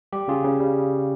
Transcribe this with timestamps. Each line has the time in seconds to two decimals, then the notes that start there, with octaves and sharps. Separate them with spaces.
0.13 G3 G4
0.28 C#3 F4 G#4
0.44 C#3
0.60 G3